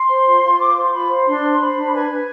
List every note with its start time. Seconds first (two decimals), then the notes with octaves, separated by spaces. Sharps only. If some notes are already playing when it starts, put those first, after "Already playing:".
Already playing: C6
0.09 C5
0.26 F4
0.42 F4
0.59 C5 D6
0.75 C5 C6
0.92 F4 B5
1.09 C5
1.25 D4 C6
1.42 C5
1.59 C5 B5
1.75 D4
1.92 B4 G#5
2.09 B4